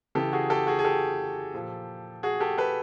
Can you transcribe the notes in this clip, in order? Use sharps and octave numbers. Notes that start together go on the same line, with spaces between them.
C#3 E3 G4 A4
F#4 G#4
G4 A4
F#4 G#4
G#4
G4 A4
A#2 F3
F#4 G#4
G4 A4
A4 B4